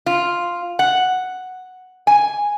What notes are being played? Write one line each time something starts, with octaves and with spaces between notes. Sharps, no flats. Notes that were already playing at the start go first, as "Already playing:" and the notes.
F4
F#5
G#5